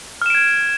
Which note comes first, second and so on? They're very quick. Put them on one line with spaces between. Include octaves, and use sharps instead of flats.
F6 E7 D7 G#6